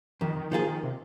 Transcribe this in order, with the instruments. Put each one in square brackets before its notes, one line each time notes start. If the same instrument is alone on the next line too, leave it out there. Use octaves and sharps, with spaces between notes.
[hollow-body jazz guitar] F2 [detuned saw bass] D#3
[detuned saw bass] D#3
[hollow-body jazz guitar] D#3 A#3 F4 G#4 [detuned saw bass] F3
[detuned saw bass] D#3
C3